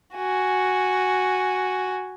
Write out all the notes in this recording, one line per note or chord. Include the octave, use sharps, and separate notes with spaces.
F#4 G#5